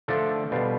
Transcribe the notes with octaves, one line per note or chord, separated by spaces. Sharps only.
D3 F3 A3 D4 A4 A5
B2 G3 D4 F4